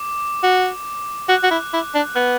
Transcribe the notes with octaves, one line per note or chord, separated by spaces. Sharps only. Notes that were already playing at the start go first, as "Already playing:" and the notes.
Already playing: D6
F#4
F#4 F#6
F#4
E4
E4
D4
B3 F#6